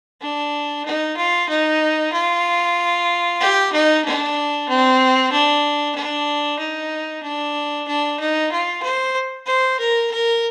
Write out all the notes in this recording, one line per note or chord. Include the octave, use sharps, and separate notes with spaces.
D4
D#4
F4
D#4
F4
G4
D#4
D4
C4
D4
D4
D#4
D4
D4
D#4
F4
C5
C5
A#4
A#4